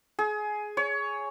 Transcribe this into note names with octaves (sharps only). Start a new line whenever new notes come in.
G#4
C#5